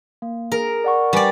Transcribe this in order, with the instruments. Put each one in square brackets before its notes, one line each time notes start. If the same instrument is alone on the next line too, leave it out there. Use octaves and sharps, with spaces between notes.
[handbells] A#3
[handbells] G#4 [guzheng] A#4
[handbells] D5 F#5 C#6
[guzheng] G3 D5 [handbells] G4 B4 G#5